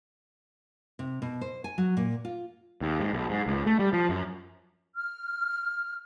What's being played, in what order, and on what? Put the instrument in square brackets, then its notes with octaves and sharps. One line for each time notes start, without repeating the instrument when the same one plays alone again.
[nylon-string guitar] C3
B2
C5
G#5
F#3
A#2
F4
[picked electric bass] D#2
G#2
B1
G#2
C#2
A3
G3
F3
F#2
[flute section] F6